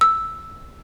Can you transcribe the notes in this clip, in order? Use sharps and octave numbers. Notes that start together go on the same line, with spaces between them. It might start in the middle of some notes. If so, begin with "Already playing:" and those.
E6